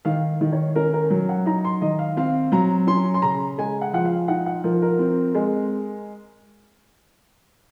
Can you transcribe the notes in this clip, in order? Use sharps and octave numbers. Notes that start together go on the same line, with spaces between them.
D#3 F5
D#3
C#5
C#4 A#4
A#4
F#3
F#5
D#4 A#5
C6
D#3 D#5
F5
C4 F5
F#3 A#5
C#4 C6
C6
C#3 A#5
G#3 G#5
F#5
F3 F#5
F5
D#4 F#5
F#5
F3 A#4
A#4
C4
G#3